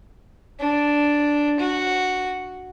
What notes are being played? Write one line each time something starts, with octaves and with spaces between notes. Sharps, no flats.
D4
F#4